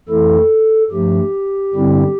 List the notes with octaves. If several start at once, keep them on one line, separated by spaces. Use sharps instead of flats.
F2 E3 A3 E4 A4
G2 F3 A3 G4
G2 D3 G3 C4 E4